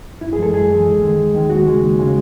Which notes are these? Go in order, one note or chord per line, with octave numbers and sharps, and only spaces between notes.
F#2 E4
G#4
E3 G#3 A4
F#2 G#4
E3 G#3
D#2
D#3 G#3
D#2
D#3 G#3
D#2 F#4
C#3 G#3
D#2
C#3 G#3